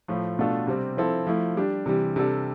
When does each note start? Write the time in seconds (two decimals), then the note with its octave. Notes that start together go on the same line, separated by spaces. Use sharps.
0.08 A2 F3 A3
0.39 B2 A3 D4 F4 A4
0.67 C3 G3 C4 G4
0.97 F3 C4 E4 A4
1.27 F3 A3 E4
1.57 G3 D4 G4
1.86 C3 E3 G3
2.16 C3 G3 D4 A4